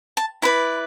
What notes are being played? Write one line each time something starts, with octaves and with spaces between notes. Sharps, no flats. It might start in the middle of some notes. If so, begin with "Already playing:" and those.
A5
E4 B4 D5 B5